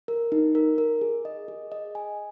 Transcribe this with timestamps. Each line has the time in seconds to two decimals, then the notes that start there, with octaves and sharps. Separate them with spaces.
0.08 A#4
0.32 D#4
0.55 A#4
0.78 A#4
1.01 G#4
1.25 D#5
1.48 G#4
1.72 D#5
1.95 G#5